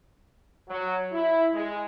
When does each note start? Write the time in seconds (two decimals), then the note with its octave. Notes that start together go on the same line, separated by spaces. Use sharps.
0.69 F#3
1.12 E4
1.53 G#3